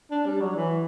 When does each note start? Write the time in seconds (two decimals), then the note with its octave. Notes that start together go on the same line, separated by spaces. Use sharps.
0.11 D4
0.26 G3
0.41 F#3
0.55 E3